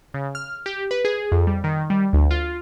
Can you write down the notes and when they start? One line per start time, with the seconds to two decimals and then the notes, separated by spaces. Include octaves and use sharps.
0.14 C#3
0.35 F6
0.66 G4
0.91 B4
1.05 G#4
1.32 F2
1.47 G3
1.64 D#3
1.90 G3
2.13 D2
2.31 F4